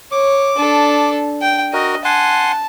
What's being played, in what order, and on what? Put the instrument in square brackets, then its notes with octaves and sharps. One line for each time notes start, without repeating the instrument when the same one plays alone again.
[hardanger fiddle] C#5 [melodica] D6
[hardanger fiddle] D4 A4
G5
[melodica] F#4 A#4 [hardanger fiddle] D#5
[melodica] F#5 G#5 C6 [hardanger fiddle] A5